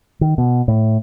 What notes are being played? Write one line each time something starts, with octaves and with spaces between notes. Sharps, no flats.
D#3
B2
A2